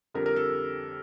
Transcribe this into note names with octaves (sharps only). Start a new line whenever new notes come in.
F2 D3 G3 A#4
A#4
A4